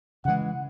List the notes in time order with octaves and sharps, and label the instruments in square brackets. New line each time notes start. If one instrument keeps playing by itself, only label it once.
[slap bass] C#3 E3 G#3 [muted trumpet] F#5